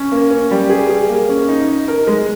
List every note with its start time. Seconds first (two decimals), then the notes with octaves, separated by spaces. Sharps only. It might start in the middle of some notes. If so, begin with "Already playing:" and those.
Already playing: C#4
0.12 A#3
0.31 C#4
0.51 G3
0.70 G#4
0.89 G#4
1.09 A#3
1.29 C#4
1.49 D#4
1.69 D#4
1.88 A#4
2.07 G#3